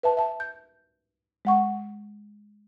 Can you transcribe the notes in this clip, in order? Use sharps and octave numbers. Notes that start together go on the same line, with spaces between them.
B4 E5 A5
E5 A5
G6
G#3 F#5 C#6